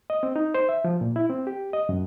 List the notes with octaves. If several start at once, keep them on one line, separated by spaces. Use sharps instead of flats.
D#5
C4
D#4
C5
E5
F3
A#2
E4
C4
G4
D#5
F#2